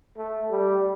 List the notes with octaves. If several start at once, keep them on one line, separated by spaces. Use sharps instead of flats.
A3
G3